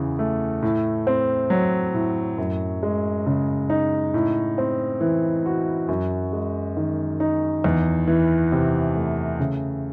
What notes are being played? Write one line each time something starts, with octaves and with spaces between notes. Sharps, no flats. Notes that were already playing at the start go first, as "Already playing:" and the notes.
Already playing: E2 C#3 E3
A3
A2
C4
F#3
A2
F#2
G#3
C#3
D#4
A2
C4
E3
F#4
F#2
G#3
D#3
D#4
E2
E3
C3
A3
C#3